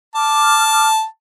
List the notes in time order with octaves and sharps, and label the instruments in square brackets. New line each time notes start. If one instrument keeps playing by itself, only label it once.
[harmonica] A5 [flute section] D6 F6